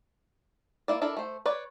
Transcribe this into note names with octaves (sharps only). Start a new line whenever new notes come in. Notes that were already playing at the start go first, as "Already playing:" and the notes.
A#3 E4 D5
D4 E4 A4 A#4
A3 C5
B4 C#5 D5